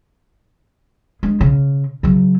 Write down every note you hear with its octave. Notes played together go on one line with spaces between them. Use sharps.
G#3 D4
C#3
C#3 F#3